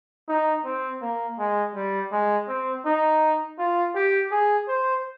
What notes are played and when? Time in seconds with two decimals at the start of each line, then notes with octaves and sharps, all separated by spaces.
0.28 D#4
0.65 C4
1.02 A#3
1.38 G#3
1.75 G3
2.12 G#3
2.48 C4
2.85 D#4
3.58 F4
3.95 G4
4.31 G#4
4.69 C5